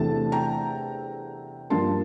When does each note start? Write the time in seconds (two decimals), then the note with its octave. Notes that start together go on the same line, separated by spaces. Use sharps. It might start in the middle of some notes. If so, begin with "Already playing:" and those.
Already playing: E2 C3 E3 A3 D4 A5
0.32 G5 A#5
1.70 G2 F3 A#3 D4 A5 C6